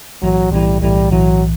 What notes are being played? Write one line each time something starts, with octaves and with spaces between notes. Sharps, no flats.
B1 A2 E3 F#3
B1 A2 E3 G3
B1 A2 E3 G3
B1 A2 E3 F#3